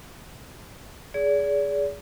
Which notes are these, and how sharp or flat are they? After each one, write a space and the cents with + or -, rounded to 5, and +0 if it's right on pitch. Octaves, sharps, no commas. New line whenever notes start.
G#4 +0 D5 -35